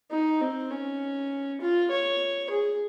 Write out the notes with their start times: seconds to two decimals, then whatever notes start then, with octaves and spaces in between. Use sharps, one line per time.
0.11 D#4
0.41 C4
0.71 C#4
1.61 F4
1.90 C#5
2.50 G#4